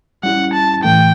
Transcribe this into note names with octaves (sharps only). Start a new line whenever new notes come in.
G3 C#4 E4 G4 F#5
A5
A2 E3 A3 G5